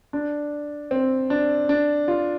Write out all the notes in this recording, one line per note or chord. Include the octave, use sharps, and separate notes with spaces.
D4
C4
D4
D4
F4